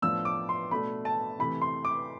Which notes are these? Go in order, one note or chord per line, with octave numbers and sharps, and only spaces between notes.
A2 F3 B3 D4 E6
D6
C6
B2 A3 D4 B5
A5
C3 E3 A3 B5
C6
D6